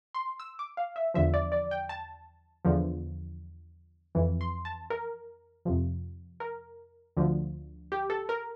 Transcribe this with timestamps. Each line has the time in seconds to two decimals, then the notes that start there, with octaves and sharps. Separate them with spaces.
0.14 C6
0.40 E6
0.59 D6
0.77 F5
0.96 E5
1.14 E2 D3 F3 E5
1.34 D5
1.52 D5
1.71 G5
1.89 A5
2.65 E2 D3 F3
4.15 F2 E3
4.41 C6
4.65 A5
4.90 A#4
5.65 F2 C3 F3
6.40 A#4
7.16 D2 D3 F3
7.92 G4
8.10 A4
8.29 A#4